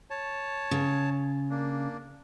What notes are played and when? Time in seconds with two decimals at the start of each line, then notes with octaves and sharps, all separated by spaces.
0.10 C#5 A5
0.71 C#3
1.50 A#3 D4